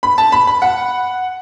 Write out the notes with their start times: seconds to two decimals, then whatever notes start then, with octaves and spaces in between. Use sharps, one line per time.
0.03 B5
0.18 A5
0.32 B5
0.47 B5
0.62 F#5